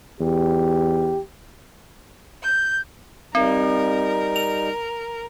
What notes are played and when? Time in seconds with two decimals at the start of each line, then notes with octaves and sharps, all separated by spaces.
0.20 E2 G4
2.41 G6
3.35 G3 C4 D#4 A#4
4.36 F7